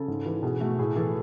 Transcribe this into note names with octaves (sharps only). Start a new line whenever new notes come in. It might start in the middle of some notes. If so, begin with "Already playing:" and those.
Already playing: C#3 A4
G#2
E3
B2 G#4
A3 F#4
A2 G#4
E3 A4